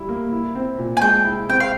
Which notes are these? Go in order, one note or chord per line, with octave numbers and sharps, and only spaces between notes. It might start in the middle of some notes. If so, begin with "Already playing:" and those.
Already playing: G3 E4
A#3
E4
C4
A#2
G#5
G#3 G5
E4
C4 G5
F5